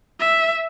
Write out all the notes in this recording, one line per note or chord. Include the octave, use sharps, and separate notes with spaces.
E5